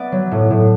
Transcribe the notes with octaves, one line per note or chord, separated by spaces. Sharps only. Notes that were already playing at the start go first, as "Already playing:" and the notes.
Already playing: B3 D5 E5 F#5
F#3
A2
A2